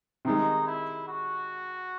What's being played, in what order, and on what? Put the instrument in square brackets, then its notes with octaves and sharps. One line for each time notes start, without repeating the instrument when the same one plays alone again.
[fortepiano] C3 D#3 G#3 [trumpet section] D#4
[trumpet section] E4
F#4